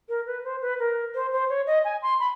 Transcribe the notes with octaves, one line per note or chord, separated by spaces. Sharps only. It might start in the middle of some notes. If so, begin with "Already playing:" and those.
A#4
B4
C5
B4
A#4
C5
C5
C#5
D#5
G#5
C6
B5